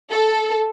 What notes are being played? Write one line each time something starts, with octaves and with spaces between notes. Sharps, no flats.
A4